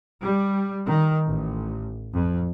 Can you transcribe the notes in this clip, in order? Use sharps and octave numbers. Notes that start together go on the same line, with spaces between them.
G3
D#3
A1
F2